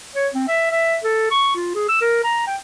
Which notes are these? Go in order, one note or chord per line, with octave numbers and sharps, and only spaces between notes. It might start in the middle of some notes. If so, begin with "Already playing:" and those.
C#5
C4
E5
E5
A4
C#6
F4
G#4
E6
A#4
A#5
G5